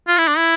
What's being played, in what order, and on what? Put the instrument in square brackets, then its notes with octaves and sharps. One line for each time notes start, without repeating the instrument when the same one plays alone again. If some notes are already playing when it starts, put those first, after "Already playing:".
[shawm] F4
E4
D4
E4